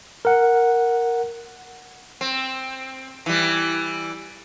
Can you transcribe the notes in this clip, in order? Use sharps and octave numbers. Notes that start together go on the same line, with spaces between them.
A#4 F#5
C4
E3 G3